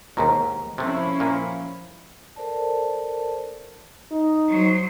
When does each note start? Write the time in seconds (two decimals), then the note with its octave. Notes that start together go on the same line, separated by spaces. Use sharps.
0.17 D#2 G#2 B2 A#4
0.78 C3 F3 A3 C#4 E4
1.20 A#2 A#3
2.36 A4 A#4 C5 D5 A5
4.11 D#4
4.49 F#3 C5